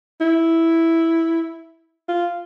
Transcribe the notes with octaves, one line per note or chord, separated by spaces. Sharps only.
E4
F4